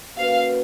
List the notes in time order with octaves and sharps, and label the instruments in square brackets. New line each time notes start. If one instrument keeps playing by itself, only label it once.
[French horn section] A#3 C#4 F#4 B4 [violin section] F5